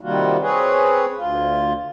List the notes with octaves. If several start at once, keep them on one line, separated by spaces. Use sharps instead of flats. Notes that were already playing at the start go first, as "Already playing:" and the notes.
C3 D#3 G3 A#3 F4 F#4
C4 G#4 B4 C#5
D2 F4